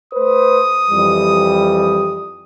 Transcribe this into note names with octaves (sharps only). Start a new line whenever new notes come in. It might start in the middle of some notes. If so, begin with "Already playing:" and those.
A3 B4 C5 D#6
F2 E3 G3